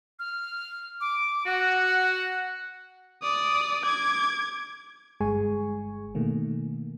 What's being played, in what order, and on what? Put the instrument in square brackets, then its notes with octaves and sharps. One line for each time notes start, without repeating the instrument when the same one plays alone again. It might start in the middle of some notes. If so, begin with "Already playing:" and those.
[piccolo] F6
D6
[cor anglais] F#4 [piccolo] F#5
[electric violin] D5 D#6
D6 G#6
[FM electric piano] G1 G2 G#3 G#4 G#5 C#6
B2 D#3 A3 A#3